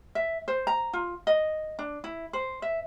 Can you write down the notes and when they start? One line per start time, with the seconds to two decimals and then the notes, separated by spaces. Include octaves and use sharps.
0.15 E5
0.48 C5
0.67 A#5
0.93 F4
1.27 D#5
1.79 D4
2.04 E4
2.33 C5
2.62 E5